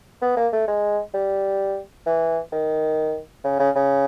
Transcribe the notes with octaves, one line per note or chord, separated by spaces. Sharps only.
B3
A#3
A3
G#3
G3
E3
D#3
C#3
C#3
C#3